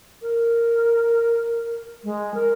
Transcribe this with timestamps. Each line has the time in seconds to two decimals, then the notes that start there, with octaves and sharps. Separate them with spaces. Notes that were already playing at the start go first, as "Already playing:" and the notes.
0.22 A#4
2.04 G#3
2.34 A#4